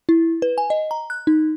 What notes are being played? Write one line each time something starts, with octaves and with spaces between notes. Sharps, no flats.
E4
B4
G#5
D#5
A#5
F#6
D#4